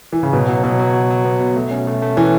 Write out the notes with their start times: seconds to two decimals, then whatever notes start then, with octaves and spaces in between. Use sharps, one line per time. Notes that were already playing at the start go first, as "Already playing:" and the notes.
0.12 E3
0.23 C#3
0.33 B2 F#3
0.48 F#3
0.63 B2 F#3
0.80 F#3
0.94 F#4
1.10 F#3
1.25 B3
1.40 B2
1.56 A3
1.71 C#4
1.87 A3
2.02 A3
2.17 E3 C#4